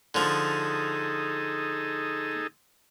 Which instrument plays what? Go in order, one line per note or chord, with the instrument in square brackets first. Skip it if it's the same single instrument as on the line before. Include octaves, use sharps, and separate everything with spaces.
[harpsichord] D3 F3 [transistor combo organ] D#4 G#4 A4